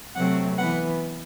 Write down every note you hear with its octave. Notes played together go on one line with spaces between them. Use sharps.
C3 F#3 A3 C4 F#5
E3 B3 F#5